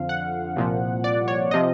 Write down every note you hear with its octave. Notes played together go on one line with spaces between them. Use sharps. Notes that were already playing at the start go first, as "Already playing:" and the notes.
Already playing: F2 D3 F3 F5
F#5
C2 A#2 F3
D5
C#5
C3 F3 D#5